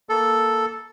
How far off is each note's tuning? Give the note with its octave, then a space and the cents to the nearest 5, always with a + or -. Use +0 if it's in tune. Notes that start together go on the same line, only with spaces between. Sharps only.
A#3 +0 A4 +0